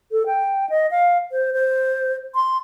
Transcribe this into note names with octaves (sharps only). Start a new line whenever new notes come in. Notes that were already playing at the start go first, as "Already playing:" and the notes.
A4
G5
D#5
F5
C5
C5
C6